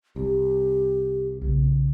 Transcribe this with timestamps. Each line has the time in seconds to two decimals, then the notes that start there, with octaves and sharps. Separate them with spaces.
0.16 C2 G4
1.41 B1 C#3